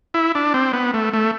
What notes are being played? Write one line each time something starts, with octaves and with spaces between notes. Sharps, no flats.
E4
D4
C4
B3
A3
A3